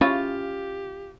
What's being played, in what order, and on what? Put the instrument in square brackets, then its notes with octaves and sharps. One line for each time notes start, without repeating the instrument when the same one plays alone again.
[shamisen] C#3 E4 C#5 [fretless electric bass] C#4 [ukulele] F4 [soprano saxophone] G4